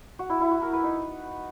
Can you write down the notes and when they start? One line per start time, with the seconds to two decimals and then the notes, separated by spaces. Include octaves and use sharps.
0.19 F#4
0.30 E4
0.41 E4
0.51 F#4
0.62 A#4
0.73 B4
0.83 D#4